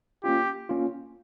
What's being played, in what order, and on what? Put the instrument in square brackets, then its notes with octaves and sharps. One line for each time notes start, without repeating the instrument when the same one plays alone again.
[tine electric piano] A#3 C#4 F4 [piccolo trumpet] G4
[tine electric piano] A#3 C#4 F4